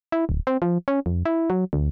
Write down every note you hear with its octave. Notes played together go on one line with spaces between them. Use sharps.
E4
D1
C4
F3
C#4
F2
E4
F#3
D2